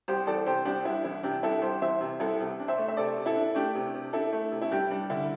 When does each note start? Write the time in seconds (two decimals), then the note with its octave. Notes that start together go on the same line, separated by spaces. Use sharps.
0.08 C2 G4 C5
0.27 E3 A4 D5
0.46 C3 G4 C5
0.65 C2 D4 G4
0.85 C2 E4
1.04 E3 E4
1.23 C3 D4 G4
1.43 C2 E4 A4
1.62 C2 G4 C5
1.82 E3 C5 E5
2.01 C3
2.20 C2 E4 A4
2.40 C3
2.59 D4
2.68 C5 E5
2.78 A3
2.88 E5
2.97 C3 A4 D5
3.17 C3
3.26 E4 A4
3.36 D4
3.55 A3 D4 G4
3.75 C3
3.94 C3
4.13 D4 E4 A4
4.32 A3
4.52 C3
4.61 E4
4.71 G2 D4 G4
4.91 G3 D4
5.10 D3 E4